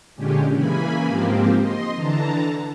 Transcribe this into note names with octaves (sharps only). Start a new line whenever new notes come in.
A#2 D3 G#3 C#4 G4
C#3 E3 A#3 G#5 B5
G#2 F3 A#3 C4 G4
D#5 C6
D3 E3 A5 A#5